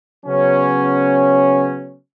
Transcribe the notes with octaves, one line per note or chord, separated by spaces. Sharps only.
C#3 F#3 B3 C#4